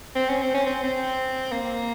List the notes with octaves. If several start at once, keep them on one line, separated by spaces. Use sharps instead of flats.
C4
C#4
C4
C#4
C4
C4
A#3